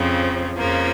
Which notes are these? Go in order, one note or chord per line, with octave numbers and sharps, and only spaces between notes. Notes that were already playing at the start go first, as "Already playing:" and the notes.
Already playing: F2 C#3 F3 C4
F2 C#3 F3 A#3